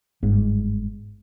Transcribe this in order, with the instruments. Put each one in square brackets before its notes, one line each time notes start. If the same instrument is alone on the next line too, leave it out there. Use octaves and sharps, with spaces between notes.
[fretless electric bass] G1 G#2